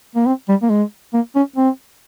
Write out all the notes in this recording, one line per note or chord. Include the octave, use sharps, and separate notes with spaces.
A#3
C4
G3
A#3
G#3
A#3
C#4
C4